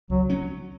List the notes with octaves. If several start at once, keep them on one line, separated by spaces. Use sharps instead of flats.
C#2 F#3
F#3 C#4